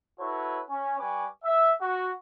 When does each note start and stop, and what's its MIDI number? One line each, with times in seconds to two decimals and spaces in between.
0.20 0.61 64
0.20 0.61 66
0.20 0.61 69
0.20 0.61 71
0.20 0.61 73
0.70 0.97 61
0.99 1.27 55
0.99 1.27 71
0.99 1.27 80
0.99 1.27 85
0.99 1.27 86
1.44 1.72 76
1.81 2.11 66